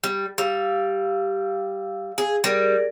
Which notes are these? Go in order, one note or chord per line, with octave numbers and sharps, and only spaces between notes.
G3
G3 F5 E6
G#4
G3 G#4 A#4 D5